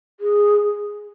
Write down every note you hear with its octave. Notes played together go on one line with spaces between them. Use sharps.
G#4